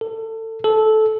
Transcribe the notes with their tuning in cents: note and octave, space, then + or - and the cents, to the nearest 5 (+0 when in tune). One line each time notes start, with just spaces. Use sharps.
A4 +25
A4 -15